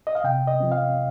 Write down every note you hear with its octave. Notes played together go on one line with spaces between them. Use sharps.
D#5
F5
C3 G5
D#5
F3 C4
F5